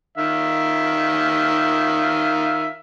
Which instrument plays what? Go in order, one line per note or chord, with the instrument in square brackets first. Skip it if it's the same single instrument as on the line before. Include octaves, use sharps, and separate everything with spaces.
[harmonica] D#3 E5 F5